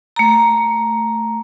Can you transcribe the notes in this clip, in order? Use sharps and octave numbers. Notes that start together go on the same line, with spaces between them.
A3 A#5